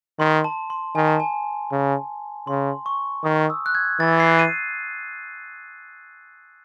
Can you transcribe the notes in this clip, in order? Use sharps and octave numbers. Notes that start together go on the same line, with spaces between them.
D#3 C6
A5
C6
D#3 G#5
A5
G#5
C#3
C#3 C6
C#6
D#3 D#6
E6
F#6
G#6
E3 A6
C7
D#7